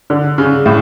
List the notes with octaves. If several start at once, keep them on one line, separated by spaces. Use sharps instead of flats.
D3
C#3
A2